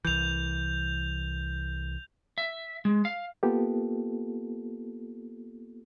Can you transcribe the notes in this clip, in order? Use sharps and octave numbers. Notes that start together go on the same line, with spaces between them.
C2 E3 G6 F7
E5
G#3
F5
A#3 B3 F4 G4 A4